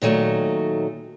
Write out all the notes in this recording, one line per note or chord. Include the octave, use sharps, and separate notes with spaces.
A#2 D#3 F#3 A3